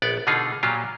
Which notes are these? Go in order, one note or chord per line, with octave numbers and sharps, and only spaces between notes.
A#1 B3 D5
B2 D3 D#4 F4 G#4
A#2 F#3 F4 G4